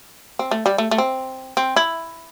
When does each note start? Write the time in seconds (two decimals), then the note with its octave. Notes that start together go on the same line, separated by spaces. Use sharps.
0.39 C4
0.51 A3
0.66 G3
0.78 A3
0.91 A3
0.98 C4
1.57 C4
1.76 E4